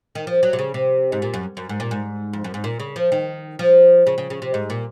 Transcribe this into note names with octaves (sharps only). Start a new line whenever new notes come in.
D#3
F3
F#3
C3
C#3
C3
G#2
A#2
F#2
F#2
G#2
A#2
G#2
F2
F#2
G#2
A#2
C#3
F3
D#3
F3
C#3
C#3
C#3
C3
G#2
A#2